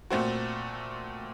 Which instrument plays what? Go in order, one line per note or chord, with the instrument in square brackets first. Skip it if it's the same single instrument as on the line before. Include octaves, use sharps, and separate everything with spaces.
[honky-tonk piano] A#2 A3 C4 F#4